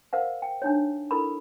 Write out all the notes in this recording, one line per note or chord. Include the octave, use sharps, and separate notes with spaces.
A#4 C5 F5 F#5
G5
D4 D#4 C#5
E4 A4 A#4 B5